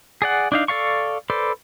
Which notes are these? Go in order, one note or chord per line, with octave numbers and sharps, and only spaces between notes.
G#4 D5 F#5
D4 D#4 F5
A4 D5 F5 C#6
A4 B4 C5 D5